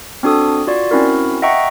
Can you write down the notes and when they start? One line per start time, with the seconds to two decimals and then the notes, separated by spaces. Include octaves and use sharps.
0.23 C4 D4 F#4 A4 D#6
0.67 F4 F#4 D5
0.91 C4 C#4 E4 F#4 A#4
1.42 D#5 E5 F#5 G5 A#5 C#6